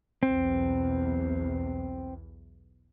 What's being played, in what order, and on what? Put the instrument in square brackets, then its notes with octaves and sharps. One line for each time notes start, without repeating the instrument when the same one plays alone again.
[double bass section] B1 E2 [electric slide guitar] C4